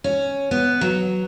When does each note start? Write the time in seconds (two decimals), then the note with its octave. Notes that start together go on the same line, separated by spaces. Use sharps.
0.04 C#4
0.51 B3
0.81 F#3